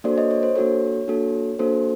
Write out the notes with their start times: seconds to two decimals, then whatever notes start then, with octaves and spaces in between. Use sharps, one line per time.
0.04 A#3 D4 F#4 A4 C5 D5
0.17 C#5 D#5
0.31 C#5
0.43 C5
0.56 A#3 D4 F#4 A4 C#5
1.08 A#3 D4 F#4 A4
1.59 A#3 D4 F#4 A4 C5